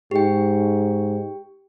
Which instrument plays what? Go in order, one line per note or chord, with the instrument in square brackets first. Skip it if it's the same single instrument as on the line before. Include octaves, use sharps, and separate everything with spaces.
[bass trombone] G#2 [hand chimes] G4 G5